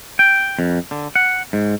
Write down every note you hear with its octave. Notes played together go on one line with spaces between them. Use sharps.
G5
F2
D3
F#5
G#2